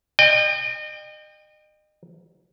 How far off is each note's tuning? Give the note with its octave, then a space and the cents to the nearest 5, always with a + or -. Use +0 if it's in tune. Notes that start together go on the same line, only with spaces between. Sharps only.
D#5 -35 G5 +20